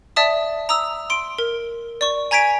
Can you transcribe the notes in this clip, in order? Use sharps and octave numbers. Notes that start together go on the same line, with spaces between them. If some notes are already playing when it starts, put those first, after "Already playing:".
D5 E5 A5 D#6
A#5 D#6 E6
C6 D7
A#4
D5 C#6
G#5 A#5 G#6 B6 D7